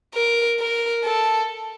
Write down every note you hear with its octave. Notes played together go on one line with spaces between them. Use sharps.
A#4
A#4
A4